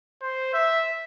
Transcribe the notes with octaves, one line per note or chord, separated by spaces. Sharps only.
C5
E5